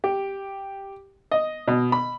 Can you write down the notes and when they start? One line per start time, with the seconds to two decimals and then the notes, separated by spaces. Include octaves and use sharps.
0.04 G4
1.31 D#5
1.68 B2
1.92 B5